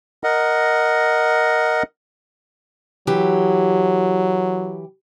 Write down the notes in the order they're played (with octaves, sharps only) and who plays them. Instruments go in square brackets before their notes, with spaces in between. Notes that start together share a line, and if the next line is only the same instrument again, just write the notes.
[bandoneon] A#4 D#5 F#5
[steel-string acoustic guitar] E3 G4 [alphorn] F#3